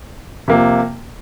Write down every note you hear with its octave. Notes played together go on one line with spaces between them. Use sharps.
C3 F3 A#3